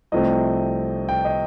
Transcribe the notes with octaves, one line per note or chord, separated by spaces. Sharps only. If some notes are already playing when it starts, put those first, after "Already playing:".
C2 C3 F3 A3 C4 D#5
G5
D#5